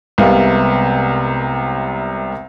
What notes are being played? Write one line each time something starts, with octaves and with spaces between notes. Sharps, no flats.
C2 C3 G#3 B3 A#4 F5